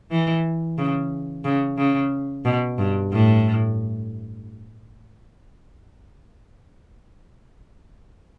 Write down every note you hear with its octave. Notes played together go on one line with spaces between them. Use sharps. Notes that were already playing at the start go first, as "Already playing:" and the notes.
E3
C#3
C#3
C#3
B2
G2
A2